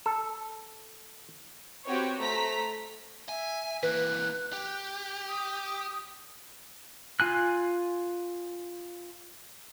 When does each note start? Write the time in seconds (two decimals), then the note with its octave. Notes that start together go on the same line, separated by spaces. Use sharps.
0.06 A4
1.86 C4 F#4 G4 B4 C#5
2.18 A3 C5 A#5 B6
3.29 E5 G#5
3.83 E3 A#3 B4 F#6
4.53 G4
5.28 D#6
7.20 F4 G#5 F#6